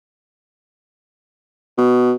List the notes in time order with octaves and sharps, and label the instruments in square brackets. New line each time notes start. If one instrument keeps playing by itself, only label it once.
[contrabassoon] B2